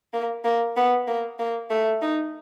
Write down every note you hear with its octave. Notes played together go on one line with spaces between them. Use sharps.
A#3
A#3
B3
A#3
A#3
A3
D#4